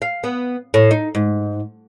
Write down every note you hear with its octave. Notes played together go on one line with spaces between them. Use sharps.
F5
B3
A2
D#4
G#2